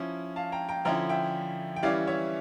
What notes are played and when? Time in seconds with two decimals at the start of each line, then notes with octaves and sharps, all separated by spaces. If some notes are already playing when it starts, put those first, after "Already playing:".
Already playing: F3 C#4 E4
0.36 F5 A5
0.52 G5 A#5
0.69 G5 A#5
0.85 D3 F3 C#4 E4 G5 A#5
1.09 E5 G5
1.76 G5
1.83 E3 G3 C#4 E4 D5 F5
2.07 C#5 E5